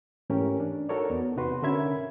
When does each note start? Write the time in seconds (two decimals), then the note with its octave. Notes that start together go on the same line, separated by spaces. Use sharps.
0.30 G#2 E3 A3 C#4 G4 A#4
0.60 D4
0.89 D#4 F#4 A4 A#4 C#5 D5
1.10 E2 B3
1.37 C3 D#4 F#4 B4 C6
1.62 D3 C#4 A#4 E5 B5 G#6